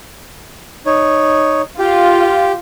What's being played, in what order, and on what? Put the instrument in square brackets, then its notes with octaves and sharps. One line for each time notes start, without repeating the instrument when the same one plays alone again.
[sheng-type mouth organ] D#4 C#5
[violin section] F4 [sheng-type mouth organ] G4